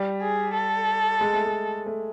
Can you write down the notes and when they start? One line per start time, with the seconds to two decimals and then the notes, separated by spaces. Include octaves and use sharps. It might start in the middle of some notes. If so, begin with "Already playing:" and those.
Already playing: G3
0.22 G#4
0.54 A4
1.21 G#3
1.33 A3
1.45 G#3
1.86 A3